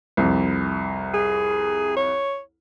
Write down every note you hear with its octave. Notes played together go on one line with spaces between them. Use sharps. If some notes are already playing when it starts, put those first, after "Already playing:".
C2 F2
G#4
C#5